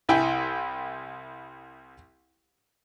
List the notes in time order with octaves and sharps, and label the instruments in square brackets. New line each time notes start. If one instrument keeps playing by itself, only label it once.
[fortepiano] C2 E4 G5 G#5